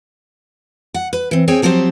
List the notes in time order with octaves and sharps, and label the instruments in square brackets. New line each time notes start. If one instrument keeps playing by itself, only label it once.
[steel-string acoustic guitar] F#5
B4
E3 C4
C4 G#4 C#5 G5 G#5
F3 F#3 C4 G4 C5